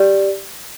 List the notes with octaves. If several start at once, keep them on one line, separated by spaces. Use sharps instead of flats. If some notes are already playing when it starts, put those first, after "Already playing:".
Already playing: G4 D5